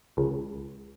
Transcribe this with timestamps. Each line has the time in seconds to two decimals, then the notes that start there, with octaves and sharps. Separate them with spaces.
0.17 C#2